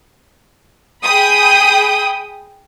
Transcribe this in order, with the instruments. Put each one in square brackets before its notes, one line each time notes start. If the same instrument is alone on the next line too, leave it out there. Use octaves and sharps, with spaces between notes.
[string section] G#4 G5 B5 D#6